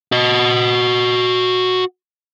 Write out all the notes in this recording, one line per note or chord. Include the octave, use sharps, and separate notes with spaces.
F#4 D#5